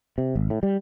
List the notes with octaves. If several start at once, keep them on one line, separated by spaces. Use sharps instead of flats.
C3
G#1
A2
G3